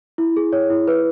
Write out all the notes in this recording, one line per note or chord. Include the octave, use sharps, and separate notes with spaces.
E4
G#4
C#5
E4
B4